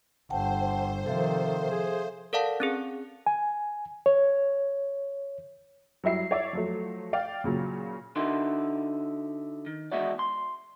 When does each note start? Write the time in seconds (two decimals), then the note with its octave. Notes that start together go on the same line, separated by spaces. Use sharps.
0.30 G1 C5 F#5 G5 A5
1.06 C3 D#3 F3 A4 E5 F5
1.71 G#4
2.33 A4 A#4 D5 F5 F#5 A5
2.60 C4 C#4 G#4
3.26 G#5
4.06 C#5
6.04 F#3 G3 E4 C7
6.31 C#5 D5 E5
6.53 F3 F#3 A3
7.13 D5 F5 G5
7.44 A#2 C#3 F#3
8.16 D3 D#4 E4 F#4 C6
9.66 D#3
9.92 E2 B2 G#3 E4 F#4 D5
10.19 C6